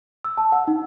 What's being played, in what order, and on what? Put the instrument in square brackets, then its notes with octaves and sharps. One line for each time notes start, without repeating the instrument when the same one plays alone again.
[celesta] E6
A5
F#5
D#4